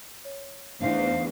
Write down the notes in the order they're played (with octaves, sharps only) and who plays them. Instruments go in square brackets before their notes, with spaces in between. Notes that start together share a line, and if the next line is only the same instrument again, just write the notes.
[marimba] C#5
[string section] E2 [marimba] A3 D4 [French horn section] D#4 C5 [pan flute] F5